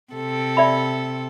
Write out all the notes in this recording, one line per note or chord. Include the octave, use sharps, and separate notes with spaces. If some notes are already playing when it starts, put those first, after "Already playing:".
C3 A4
D5 E5 B5